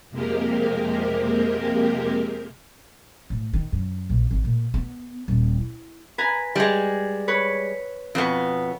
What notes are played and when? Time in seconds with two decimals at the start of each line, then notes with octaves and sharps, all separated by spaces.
0.10 F2 C3 G#3 A#3 G4 A#4
3.30 A2
3.54 D#3
3.72 F#2
4.10 A#1
4.31 G#1
4.45 A#2
4.74 B3
5.28 D#1
5.58 E4
6.18 B4 G#5 A#5
6.56 G3 G#3
7.28 B4 C#5
8.15 F2 B2 B3